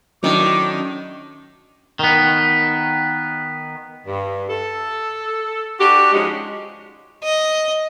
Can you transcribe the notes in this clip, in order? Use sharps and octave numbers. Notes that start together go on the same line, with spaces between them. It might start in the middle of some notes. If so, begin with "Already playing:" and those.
A2 D#3 F#3 C#4 D4 D6
D#3 B3
G2
A4
D4 F#4 G4
F3 G#3 C#4 D#4 F#4
D#5